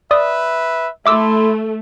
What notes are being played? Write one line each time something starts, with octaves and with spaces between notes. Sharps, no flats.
B4 D5 E5 D#6
A3 E4 E5 C6 D6 E6